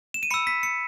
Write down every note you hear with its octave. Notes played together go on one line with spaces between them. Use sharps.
E7
D#7
B5 E6 C#7
B6
C#7